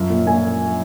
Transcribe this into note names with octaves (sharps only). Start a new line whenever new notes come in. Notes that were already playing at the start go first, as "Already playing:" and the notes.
Already playing: F#2 F3
A#2
A#2 G#5